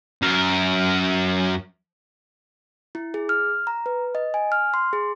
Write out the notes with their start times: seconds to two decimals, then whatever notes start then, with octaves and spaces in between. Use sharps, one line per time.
0.22 F#2 A#4
2.95 E4
3.14 G#4
3.29 F6
3.67 A#5
3.86 B4
4.15 D#5
4.34 G#5
4.52 F6
4.74 C6
4.93 G#4